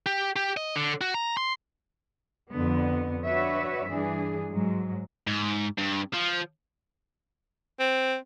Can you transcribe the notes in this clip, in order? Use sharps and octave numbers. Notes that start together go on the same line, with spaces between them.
G4
G4
D#5
D3
F#4
A#5
C6
F2 D3 B3
D4 F#4 B4 C#5 E5
G2 E3 D4 G#4
G#2 F#3 G#3
G#2
G2
F3
C4